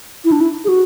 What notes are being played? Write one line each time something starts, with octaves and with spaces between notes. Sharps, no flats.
E4
D4
E4
G#4
F#4